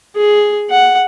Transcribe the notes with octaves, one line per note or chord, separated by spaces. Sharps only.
G#4
F#5